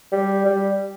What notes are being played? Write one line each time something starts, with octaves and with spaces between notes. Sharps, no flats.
G3
G3